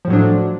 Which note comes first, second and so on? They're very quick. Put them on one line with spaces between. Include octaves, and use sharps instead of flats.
F3 A2 F#3 D4